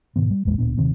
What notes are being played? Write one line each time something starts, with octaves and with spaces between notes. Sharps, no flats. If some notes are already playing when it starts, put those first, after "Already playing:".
G#2 B2 D#3 B3
G3
A1 E2 A#2 G#3
D1 A#2 B3 D4
D#1 C3 D#3 C4